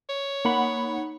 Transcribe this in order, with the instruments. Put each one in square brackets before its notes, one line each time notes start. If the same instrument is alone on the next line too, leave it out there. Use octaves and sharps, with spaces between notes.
[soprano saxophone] C#5
[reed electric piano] A#3 [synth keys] D#4 F#5 B5